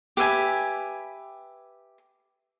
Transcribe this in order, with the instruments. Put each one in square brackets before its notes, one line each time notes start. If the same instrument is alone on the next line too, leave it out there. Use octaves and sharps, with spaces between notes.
[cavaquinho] G4 B4 E5 G#5